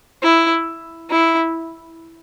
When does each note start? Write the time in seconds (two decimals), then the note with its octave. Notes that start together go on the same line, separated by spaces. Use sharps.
0.23 E4
1.10 E4